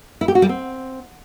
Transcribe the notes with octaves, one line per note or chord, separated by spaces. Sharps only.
E4
G4
F#4
G3
C4